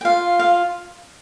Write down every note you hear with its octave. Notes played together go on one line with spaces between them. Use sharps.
G5
F4 F5
F5